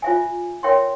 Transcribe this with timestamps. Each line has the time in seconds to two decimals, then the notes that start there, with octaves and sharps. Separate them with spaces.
0.02 F4 C5 E5 G#5
0.63 A#4 C#5 E5 G5 C6